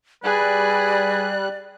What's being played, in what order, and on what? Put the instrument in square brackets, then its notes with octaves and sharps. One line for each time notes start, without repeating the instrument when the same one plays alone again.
[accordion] G3 F#6 [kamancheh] G#4 [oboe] B4 [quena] D5